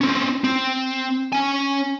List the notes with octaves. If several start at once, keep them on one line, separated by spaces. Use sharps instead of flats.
C4 C#4
C4
C#4 G#5